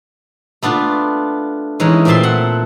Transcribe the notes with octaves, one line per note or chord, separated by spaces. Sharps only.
A3 B3 D4 F4
E3 G#3 C#4 D#4
A#2 A3 C4 E5 A5 C6
F#5